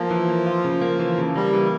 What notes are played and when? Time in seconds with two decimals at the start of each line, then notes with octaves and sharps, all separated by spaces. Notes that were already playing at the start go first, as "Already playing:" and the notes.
Already playing: F3 A#3
0.11 E3
0.29 A#3
0.47 F4
0.65 C#3
0.81 A#3
0.99 E3
1.18 C#3
1.35 G3 A#3
1.54 E3